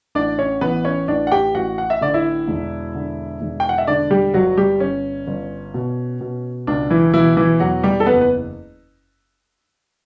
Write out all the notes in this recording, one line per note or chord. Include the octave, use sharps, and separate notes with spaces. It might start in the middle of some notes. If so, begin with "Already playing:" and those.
A1 D4 D5
C#4 C#5
E3 B3 B4
C#4 C#5
A1 D4 D5
F#5
G4 G5
A1 F#4 F#5
F#5
E5
D3 D5
E4 E5
E1
D3
E1
G5
F#5
E5
D3 D4 D5
G3 G4
G1 F#3 F#4
G3 G4
G1 C#4
G1
B2
B2
C#2 D4
E3 E4
B2 E3 E4
E3 E4
E2 F#3 F#4
G3 G4
A4
F#1 B3 B4
B4